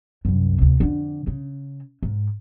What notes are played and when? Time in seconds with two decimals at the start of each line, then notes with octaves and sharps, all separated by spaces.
0.25 C2 F#2
0.58 D2 C3
0.80 F2 D3
1.27 C#3
2.03 G#2